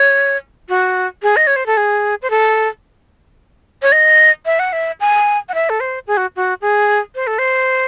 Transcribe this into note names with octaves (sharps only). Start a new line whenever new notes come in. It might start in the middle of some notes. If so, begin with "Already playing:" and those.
Already playing: C#5
F#4
G#4
D#5
C#5
C5
A4
G#4
C5
A4
C#5
D#5
E5
F#5
E5
G#5
F#5
E5
A4
C5
G#4
F#4
F#4
G#4
C5
A4
C5